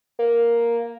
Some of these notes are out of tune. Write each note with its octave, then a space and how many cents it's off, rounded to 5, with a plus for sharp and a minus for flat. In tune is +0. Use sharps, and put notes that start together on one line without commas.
A#3 +5